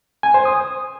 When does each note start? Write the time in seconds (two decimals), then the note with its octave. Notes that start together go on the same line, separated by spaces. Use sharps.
0.23 G#5
0.34 C5
0.45 D#6